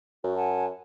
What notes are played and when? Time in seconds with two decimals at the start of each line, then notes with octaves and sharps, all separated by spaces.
0.24 F#2 F#4
0.36 F#5 G#5 A5